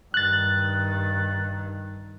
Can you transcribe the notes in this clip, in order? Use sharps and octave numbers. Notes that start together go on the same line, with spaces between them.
G2 D#3 F#6 A6